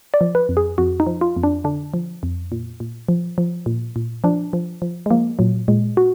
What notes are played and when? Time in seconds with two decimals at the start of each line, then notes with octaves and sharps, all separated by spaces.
0.14 D5
0.21 F3
0.35 B4
0.49 F2
0.57 G#4
0.78 F2 F#4
1.00 D#4
1.07 F3
1.21 F4
1.36 F2
1.43 D4
1.64 D3 D4
1.94 F3
2.23 F2
2.52 A#2
2.80 A#2
3.09 F3
3.38 F3
3.66 A#2
3.96 A#2
4.24 F3 D4
4.53 F3
4.82 F3
5.06 G#3
5.10 F3 A#3
5.39 A#2 F#3
5.68 A#2 G#3
5.97 F#4